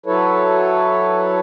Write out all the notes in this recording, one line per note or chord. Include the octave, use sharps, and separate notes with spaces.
F#3 E4 A4 B4 C#5